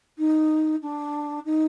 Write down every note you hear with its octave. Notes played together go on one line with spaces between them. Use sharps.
D#4
D4
D#4